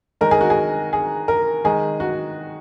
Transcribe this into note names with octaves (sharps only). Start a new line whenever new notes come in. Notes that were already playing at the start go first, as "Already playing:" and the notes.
D#3 G#3 A#4
G#4
F#4
G#4
G#4
A#4
D#3 G#3 G#4
F#4